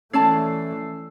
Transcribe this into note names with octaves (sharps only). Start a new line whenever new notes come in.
E3 A3 C#4 C#5 D5 A5 E6 C7